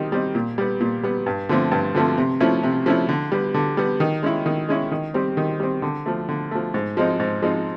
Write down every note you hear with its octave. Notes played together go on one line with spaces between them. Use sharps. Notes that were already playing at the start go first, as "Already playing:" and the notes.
Already playing: D#3 G3 C4 D#4
G3 C4 D#4
A#2
G3 B3
A#2
G3 B3
G2
D3 F3 A3 C4
G2
D3 F3 A3 C4
C3
F3 A3 C#4 E4
C3
F3 A3 C#4 E4
D3
G3 B3
D3
G3 B3
D#3
G#3 C#4 E4
D#3
G#3 C#4 E4
D#3
G3 C4
D#3
G3 C4
D3
F3 A3
D3
F3 A3
G#2
F3 G#3 C4 D#4
G#2
F3 G#3 C4 D#4